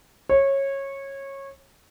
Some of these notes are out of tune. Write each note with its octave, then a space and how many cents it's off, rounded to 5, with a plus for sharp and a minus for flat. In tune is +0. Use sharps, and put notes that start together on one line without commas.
C#5 -20